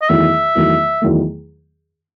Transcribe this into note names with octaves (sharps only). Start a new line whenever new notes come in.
D#5
E2 D#3 F#3 A3 E5
E2 D#3 F#3 A3
E2 D#3 F#3 A3